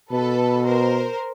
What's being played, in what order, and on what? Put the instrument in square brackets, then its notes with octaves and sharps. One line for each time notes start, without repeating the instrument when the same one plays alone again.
[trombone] B2 [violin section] A4 B4
[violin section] A#4 C5